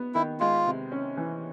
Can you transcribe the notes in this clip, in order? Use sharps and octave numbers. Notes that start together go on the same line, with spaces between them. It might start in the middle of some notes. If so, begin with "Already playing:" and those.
Already playing: B3
D#3 E4
G#3 F4
C3
C#4
E3